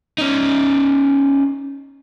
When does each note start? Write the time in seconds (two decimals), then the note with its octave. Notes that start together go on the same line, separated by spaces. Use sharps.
0.18 C#4 D#4